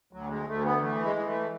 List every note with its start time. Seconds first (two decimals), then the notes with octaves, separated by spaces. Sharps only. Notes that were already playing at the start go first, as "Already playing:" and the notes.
0.13 D2 F#3
0.30 G#3
0.48 D2 A3
0.64 B3
0.81 E3 A3
1.04 G#3
1.16 E3
1.27 A3